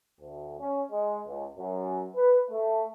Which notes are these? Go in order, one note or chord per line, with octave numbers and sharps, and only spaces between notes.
D2
C#4
G#3
C#2
F#2
B4
A3